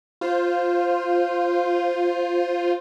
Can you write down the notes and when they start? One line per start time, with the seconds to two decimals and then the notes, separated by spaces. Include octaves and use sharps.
0.21 F4 C5